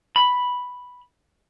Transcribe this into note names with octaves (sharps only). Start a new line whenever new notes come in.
B5